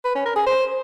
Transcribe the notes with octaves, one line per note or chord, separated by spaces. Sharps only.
B4
C#4
A#4
G#4
C5